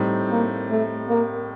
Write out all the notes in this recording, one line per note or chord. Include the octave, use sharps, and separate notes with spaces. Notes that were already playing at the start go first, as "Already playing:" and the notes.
Already playing: A2 G3 C4 D#4
A#3
A3
A#3